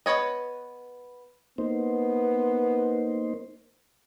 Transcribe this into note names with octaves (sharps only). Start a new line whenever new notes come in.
B3 B4 C#5 D#5
A#3 B3 D#4 C5